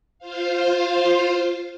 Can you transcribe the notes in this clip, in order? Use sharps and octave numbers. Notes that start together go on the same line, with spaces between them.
F4 C5 F5